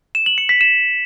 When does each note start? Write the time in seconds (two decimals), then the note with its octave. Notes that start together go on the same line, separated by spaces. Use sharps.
0.15 E7
0.26 F#7
0.38 C#7
0.49 B6
0.61 E7